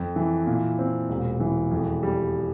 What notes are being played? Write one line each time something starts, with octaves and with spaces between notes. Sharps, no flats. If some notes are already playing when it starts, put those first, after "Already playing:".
Already playing: F2
E3
A#2
C4
E1
E3
F2
G3